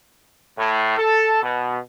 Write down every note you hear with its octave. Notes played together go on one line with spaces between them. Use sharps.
A2
A4
B2